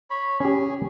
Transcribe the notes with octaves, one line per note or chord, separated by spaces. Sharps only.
C#5 B5
C#4 G4 G#4